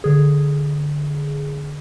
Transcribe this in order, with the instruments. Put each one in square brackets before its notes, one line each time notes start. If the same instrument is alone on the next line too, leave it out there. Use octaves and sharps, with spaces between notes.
[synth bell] D3 G#4